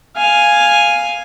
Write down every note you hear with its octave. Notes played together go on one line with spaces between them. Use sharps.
F5 G#5